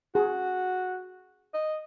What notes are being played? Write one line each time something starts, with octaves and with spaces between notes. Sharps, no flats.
F#4 G#4
D#5